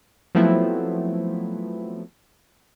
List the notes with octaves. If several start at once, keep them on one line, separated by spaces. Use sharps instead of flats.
F3 F#3 A3 B3 C4 E4